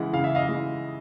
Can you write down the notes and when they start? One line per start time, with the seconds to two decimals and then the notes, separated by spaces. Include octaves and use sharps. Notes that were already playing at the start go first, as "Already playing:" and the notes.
Already playing: C#3 E3 G#3 F#5
0.13 C#3 F5
0.24 E5
0.35 D#5 F5
0.46 E3 G#3